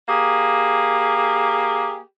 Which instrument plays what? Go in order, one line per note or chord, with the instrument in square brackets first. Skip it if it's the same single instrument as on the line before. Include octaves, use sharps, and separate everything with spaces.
[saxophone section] A#3 G4 G#4